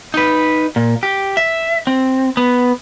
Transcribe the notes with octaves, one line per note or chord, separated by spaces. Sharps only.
D#4 B4
A#2
G4
E5
C4
B3